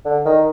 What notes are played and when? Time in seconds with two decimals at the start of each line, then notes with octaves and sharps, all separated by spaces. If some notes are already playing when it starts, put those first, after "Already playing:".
0.05 D3
0.25 D#3